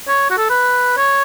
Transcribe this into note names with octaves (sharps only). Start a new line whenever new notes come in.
C#5
F#4
A4
B4
C#5